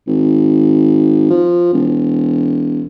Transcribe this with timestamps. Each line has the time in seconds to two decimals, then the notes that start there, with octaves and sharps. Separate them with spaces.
0.08 G#1
1.30 F3
1.73 E1